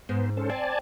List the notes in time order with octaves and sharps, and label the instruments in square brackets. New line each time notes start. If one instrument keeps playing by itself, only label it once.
[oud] G#2 [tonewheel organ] B3 C5
[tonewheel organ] C#4 A4 C5
[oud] C4 [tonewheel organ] D5 G#5 A5